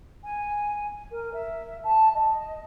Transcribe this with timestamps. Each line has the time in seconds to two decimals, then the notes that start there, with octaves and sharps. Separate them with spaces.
0.24 G#5
1.12 A#4
1.34 E5
1.84 A5
2.15 D#5